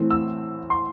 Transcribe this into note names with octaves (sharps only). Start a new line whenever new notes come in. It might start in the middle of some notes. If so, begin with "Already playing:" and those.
Already playing: A2 E3 A3 C4
E6
C6